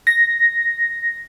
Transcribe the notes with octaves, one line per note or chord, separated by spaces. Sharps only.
A#6